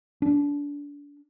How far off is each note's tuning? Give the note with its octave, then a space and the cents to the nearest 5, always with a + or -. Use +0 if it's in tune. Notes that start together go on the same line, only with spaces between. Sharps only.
D4 -30